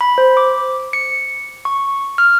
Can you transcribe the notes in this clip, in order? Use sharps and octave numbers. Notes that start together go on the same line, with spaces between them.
B5
C5
D6
C#7
C#6
F6